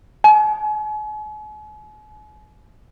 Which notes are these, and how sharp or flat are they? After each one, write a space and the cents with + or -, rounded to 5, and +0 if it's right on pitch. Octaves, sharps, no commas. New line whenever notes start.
G#5 +45